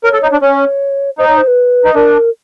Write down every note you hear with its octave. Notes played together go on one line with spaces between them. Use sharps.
A#4 C#5
A4
D#4
D4
C#4 C#5
D#4 C5
C#5
C5
B4
D#4
D4 A#4